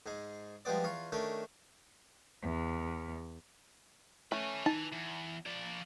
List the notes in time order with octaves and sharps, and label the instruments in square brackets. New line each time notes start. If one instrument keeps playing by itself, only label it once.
[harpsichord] G#2 G#3
F3 G3 G#3 B3 D5
E2 F4 C#6
D#3 A3 C#4 D4
[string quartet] E2
[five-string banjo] A3 C#4 [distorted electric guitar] B4 G#5
[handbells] D#4 [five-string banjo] A5
[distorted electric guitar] E2
F3 D5